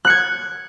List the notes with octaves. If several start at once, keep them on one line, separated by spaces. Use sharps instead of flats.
F#6 G#6 C#7